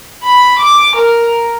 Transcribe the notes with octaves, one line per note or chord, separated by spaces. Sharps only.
B5
D6
A#4